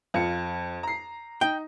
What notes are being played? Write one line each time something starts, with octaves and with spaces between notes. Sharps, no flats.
F2 F4 C#7
A#5 C7
D#4 G5